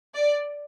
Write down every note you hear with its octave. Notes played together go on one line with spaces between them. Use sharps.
D5